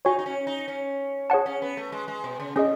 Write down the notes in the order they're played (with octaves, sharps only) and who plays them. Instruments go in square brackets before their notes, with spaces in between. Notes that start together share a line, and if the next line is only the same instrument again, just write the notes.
[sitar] D#4 [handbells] F#4 C#5 G#5
[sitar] D#4
C#4
D#4
C#4
[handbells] G#4 C#5 F#5 A5
[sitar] C#4
B3
A3
G#3
G#3
B2
C#3
[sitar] A2 [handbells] C#4 G#4 D#5